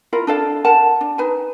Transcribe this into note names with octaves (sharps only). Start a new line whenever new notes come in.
E4 F4 A#4 F5
D4 A4 F5
A#4 F#5 A5
D4
D#4 B4 G#5